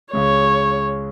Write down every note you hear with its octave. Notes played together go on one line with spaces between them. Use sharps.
C#2 C#3 G#3 C#5